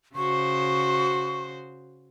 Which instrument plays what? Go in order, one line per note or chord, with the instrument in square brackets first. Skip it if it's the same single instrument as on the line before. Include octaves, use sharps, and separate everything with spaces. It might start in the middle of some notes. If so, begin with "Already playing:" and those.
[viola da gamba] C#3 F#4 C5 [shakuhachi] C#6